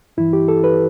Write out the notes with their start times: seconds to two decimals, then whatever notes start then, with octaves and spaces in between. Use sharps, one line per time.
0.17 G2 E3 E4
0.33 G4
0.48 A4
0.64 B4